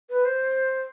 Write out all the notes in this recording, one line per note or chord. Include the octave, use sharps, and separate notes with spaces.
B4
C5